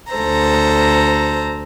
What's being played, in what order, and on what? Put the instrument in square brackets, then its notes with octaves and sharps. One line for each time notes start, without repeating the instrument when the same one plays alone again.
[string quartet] D2 A4 C5 A#5